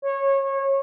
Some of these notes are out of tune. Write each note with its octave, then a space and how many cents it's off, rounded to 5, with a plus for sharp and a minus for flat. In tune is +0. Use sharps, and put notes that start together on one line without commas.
C#5 -25